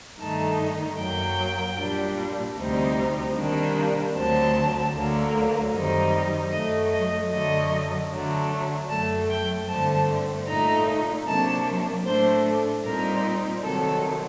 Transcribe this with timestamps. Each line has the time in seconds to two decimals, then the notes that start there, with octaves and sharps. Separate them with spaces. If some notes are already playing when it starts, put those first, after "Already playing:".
0.19 G2 D#3 A3 D#4 A5
0.99 F#2 F#3 A#3 G5
1.78 A#2 G3 D4
2.56 D2 C3 G3 C4 D#4
3.36 C3 D#3 G3 A#3 D4
4.14 D2 D3 F#3 C4 A5
4.94 D2 D3 F#3 A#3
5.72 F#2 D#3 G3 C4 D#4
6.51 F#2 F#3 A3 D#5
6.92 D#5
7.31 F#2 D3 F#3 A3 D#5
8.10 D3 F#3 A3 D4
8.89 F#2 F#3 A3 A5
9.29 G5
9.68 G2 D3 A3 C4 A5
10.46 A#2 A3 D#4 A#5
11.26 C3 F#3 A#3 D4 A5
12.05 A2 A3 D4 C5
12.84 A#2 G3 C4 D#4 A#4
13.62 C3 D#3 F#3 A4